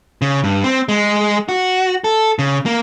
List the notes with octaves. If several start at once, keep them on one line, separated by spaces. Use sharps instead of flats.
C#3
G2
C4
G#3
F#4
A4
C#3
A#3